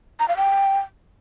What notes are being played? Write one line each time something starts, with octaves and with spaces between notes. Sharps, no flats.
A#5
F5
G5